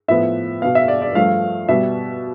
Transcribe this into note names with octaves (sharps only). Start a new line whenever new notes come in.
A2 F3 B3 E5
B2 B3 F5
E5
D5
D5
G2 F3 A3 F5
B2 G3 B3 E5